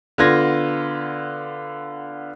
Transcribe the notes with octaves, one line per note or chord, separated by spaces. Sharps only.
D3 B3 F4 G#6 A#6